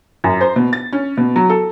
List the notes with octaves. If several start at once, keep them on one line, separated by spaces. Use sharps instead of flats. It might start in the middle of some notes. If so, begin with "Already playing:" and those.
F#2
C5
B2
A6
C#4
B2
F#3
A4